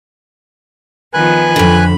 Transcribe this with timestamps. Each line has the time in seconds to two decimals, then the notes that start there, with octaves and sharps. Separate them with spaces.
1.14 D#3 F3 B3 B4 G#5 F#6
1.56 F2 D3 B5